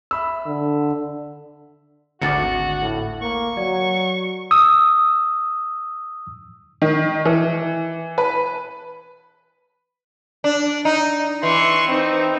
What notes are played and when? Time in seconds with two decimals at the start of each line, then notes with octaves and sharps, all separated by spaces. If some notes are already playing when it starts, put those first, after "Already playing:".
0.11 E5 B5 E6
0.46 D3
2.22 G#1 D2 F#4 D6 A6 C#7
2.82 A2
3.22 A#3 C#6
3.57 F#3 D5
4.51 D#6 E6
6.82 D#3
7.25 E3
8.18 B4
10.44 D4
10.85 D#4
11.43 E3 C6 C#6
11.89 C4 D#4